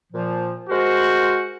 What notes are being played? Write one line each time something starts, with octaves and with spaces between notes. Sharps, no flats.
A#2 F3
G#3 F#4 A#4 C5